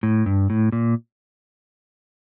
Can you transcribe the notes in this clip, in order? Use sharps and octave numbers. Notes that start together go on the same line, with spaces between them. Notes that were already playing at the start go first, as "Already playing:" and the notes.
A2
G2
A2
A#2